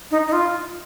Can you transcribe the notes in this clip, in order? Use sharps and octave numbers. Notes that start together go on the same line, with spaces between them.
D#4
D#4
F4